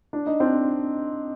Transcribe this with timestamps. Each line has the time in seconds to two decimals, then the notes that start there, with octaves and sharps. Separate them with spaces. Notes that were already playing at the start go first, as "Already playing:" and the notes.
0.13 D4
0.26 D#4
0.40 C4 D4